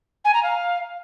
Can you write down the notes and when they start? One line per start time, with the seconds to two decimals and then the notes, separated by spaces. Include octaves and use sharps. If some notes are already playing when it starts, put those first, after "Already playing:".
0.24 G#5
0.33 A#5
0.42 F5